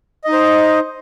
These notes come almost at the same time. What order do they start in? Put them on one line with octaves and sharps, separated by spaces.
D#5 D#4 C5